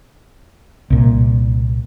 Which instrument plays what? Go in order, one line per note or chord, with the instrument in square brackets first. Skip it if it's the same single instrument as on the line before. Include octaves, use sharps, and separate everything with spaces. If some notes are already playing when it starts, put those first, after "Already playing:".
[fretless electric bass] C2 A#2